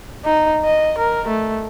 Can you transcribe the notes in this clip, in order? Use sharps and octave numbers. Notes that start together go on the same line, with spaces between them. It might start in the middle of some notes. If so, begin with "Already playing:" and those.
D#4
D#5
A#4
A3